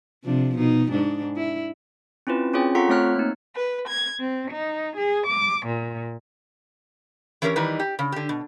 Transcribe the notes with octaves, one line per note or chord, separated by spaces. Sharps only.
C3 F3 D4
B2 D#4
G#2 D4
E4
C4 C#4 E4 F4 B4
C4 C#4 F4 G#4 C#5 G5
F4 A4 F#5 A#5 C#6 B6
A3 C4 C#5 F6 F#6
A#3 D#4
B4
G#6
C4
D#4
G#4
D6
A#2
E3 C#4 G4 A#4 B4 C#5
D#3 E3 G3 D#4 B4
G4
C#3
D3 G4
B2